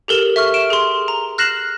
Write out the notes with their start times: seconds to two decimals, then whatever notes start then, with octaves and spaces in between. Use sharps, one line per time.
0.08 G4 A4 A#4 E7
0.36 E5 C#6 F6
0.54 D7 E7
0.70 G#4 C6
1.08 A#5
1.38 F6 F#6 A#6 C7 E7 F#7